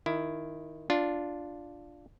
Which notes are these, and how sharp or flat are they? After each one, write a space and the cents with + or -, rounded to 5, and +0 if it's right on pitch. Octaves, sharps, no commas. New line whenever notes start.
D#3 +0 E4 +15
D4 +0 F4 +0